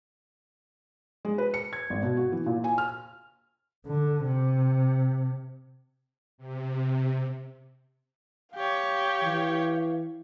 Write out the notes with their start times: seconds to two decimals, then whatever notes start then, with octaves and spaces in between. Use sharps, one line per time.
1.25 G#3
1.38 B4
1.54 C#7
1.73 G#6
1.90 G#1
2.03 B2
2.17 F#4
2.32 E3
2.46 A#2
2.64 G#5
2.78 F6
3.86 D3
4.25 C3
6.38 C3
8.56 G4 C#5 F5
9.24 E3